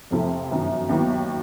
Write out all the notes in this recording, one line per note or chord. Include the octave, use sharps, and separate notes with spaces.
F2 C3 F3 A3
G1 F#2 D#3
D#2 D#3 F#3 B3 E4